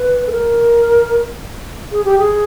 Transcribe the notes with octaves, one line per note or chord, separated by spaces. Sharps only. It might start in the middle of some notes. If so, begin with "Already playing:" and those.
Already playing: B4
A4
A#4
G#4
G4
G#4